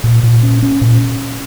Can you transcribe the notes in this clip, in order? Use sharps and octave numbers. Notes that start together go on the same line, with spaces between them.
A#2
A#2
C#4
C#4
A#2